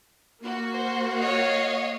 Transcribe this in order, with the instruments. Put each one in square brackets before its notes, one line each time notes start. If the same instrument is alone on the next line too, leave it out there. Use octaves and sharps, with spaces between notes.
[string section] A#3 F#4
[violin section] C5
C#5 D#5 F5